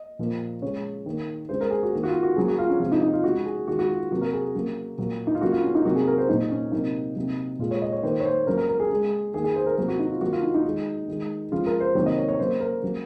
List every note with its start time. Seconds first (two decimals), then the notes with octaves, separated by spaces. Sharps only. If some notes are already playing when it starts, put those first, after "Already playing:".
Already playing: D#5
0.19 A#2 F3 A#3
0.62 C#3 G#3 C#5
1.06 D#3 A#3
1.49 C#3 G#3 C5
1.61 A#4
1.71 G#4
1.83 F#4
1.93 D#3 A#3
2.03 F#4
2.08 F4
2.23 F#4
2.36 C#3 F#3 A#3 G#4
2.48 F#4
2.58 F4
2.69 C#4
2.80 C3 F3 G#3 F4
2.92 D#4
3.02 D#4
3.13 F4
3.24 C#3 G#3 F#4
3.45 G#4
3.67 D#3 G#3 F#4
3.79 F#4
3.89 F4
4.11 C3 F#3 A#3 F#4
4.21 A#4
4.33 G#4
4.55 C#3 F#3 A#3
4.98 A#2 F#3 A#3
5.27 D#4
5.35 F4
5.41 C#3 F#3 A#3 F#4
5.52 F4
5.63 C#4
5.75 D#4
5.85 C3 F#3 A#3 F#4
5.96 G#4
6.07 A#4
6.18 C5
6.29 A#2 F#3 A#3 D#4
6.51 C#4
6.72 C3 F#3 A#3 D#4
7.15 C3 F#3 A#3
7.59 A#2 G#3 F4
7.71 C#5
7.82 D#5
7.92 C#5
8.03 D#3 A#3 C5
8.20 C#5
8.25 C5
8.47 C#3 F#3 A#3 A#4
8.57 A#4
8.69 A#4
8.80 G#4
8.90 C#3 G#3
9.34 D#3 A#3 G#4
9.44 G#4
9.56 C5
9.66 A#4
9.77 C3 F#3 A#3 A#4
9.88 F#4
9.99 D#4
10.11 F4
10.21 D#3 F#3 A#3 F#4
10.32 F4
10.42 D#4
10.54 D#4
10.65 D#3 G#3
11.08 D#3 G#3
11.52 C#3 F3 G#3 F4
11.66 A#4
11.80 C5
11.95 C3 D#3 F#3 A#3 C#5
12.06 D#5
12.18 C#5
12.29 C#5
12.39 C#3 F#3 A#3 C5
12.61 A#4
12.82 C#3 F#3 A#3